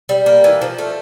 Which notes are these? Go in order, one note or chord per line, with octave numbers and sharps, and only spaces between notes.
G3
A#3
E3
F3
A3